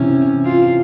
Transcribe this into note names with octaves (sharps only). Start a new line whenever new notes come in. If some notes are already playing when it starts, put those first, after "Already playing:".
Already playing: C3 E3 C#4
F4